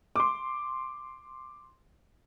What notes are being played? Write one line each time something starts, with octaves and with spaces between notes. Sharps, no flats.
C6 D6